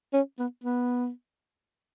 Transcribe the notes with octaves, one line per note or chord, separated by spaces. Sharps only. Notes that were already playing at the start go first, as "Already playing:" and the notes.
C#4
B3
B3